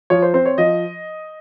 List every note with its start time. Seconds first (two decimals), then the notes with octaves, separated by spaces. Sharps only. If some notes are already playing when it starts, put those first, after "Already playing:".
0.10 F3 C#5
0.22 C5
0.34 C4 C5
0.46 C#5
0.58 F3 D#5